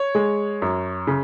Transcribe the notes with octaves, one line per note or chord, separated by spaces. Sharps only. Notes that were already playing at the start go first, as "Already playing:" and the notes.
Already playing: C#5
G#3
F#2
C#3